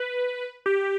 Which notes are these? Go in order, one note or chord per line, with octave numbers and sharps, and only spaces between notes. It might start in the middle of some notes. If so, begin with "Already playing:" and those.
Already playing: B4
G4